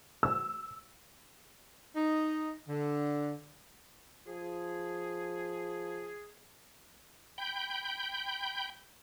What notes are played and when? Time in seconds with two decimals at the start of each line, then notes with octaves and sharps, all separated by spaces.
0.23 E6
1.95 D#4
2.68 D3
4.28 F3 G#4
7.38 G5 B5 G6